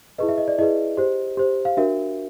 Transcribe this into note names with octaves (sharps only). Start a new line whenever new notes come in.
E4 G#4 B4 D#5
E5
D#5
D5
E4 G#4 B4 D#5
G4 C5
G4 C5
F5
D4 F#4 A#4 E5